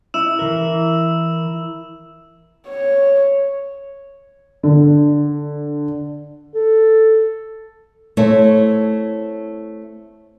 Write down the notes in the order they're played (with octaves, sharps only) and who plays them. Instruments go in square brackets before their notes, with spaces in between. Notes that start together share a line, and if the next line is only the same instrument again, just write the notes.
[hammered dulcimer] E4 [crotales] E6 E7
[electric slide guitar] E3 A#4
[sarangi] C#5
[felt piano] D3
[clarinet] A4
[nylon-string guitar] A3 C4 E4 C#5